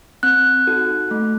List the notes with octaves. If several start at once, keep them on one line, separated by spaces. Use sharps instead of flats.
C4 F#6
D#4 F#4 A4
A3